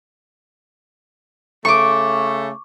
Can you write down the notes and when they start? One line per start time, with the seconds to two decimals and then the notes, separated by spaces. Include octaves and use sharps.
1.65 C#3 A3 C#6 D6